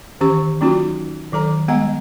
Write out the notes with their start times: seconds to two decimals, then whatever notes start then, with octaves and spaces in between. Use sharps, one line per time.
0.21 D#3 E3 C#4 G4 C#6
0.61 F#3 A#3 C#4 D#4 F4 F#4
1.32 D#3 F#3 A4 A#5
1.68 G3 G#3 B3 F#5 A#5